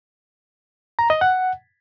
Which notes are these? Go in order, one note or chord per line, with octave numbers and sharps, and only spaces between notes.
A#5
D#5
F#5